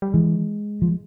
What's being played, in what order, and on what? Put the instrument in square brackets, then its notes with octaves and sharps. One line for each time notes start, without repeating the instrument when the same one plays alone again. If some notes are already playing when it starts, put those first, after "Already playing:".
[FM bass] G3
[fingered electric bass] E3 [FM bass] G#3
[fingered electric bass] F3